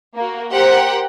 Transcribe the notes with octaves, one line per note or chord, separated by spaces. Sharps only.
A#3 F#4
G4 A#4 C5 F#5 G5